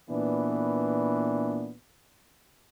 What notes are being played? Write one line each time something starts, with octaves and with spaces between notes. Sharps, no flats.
A#2 E3 B3 D4